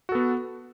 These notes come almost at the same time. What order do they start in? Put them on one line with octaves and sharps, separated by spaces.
F#4 A4 B3